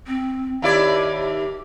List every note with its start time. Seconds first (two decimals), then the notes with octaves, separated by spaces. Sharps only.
0.07 C4
0.62 D#2 E4 G4 D5